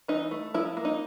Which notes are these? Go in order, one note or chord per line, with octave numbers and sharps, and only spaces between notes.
E3 D#4
A3
F3 E4
A#3
D#4